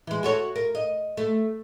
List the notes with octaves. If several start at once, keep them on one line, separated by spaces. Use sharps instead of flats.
E3 G#3
F#4 A4 C#5
A#4
D#5
A3